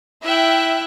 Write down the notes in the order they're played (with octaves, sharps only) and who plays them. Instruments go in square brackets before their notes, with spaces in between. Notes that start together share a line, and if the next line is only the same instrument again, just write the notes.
[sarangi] E4 [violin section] E5 G5 F#6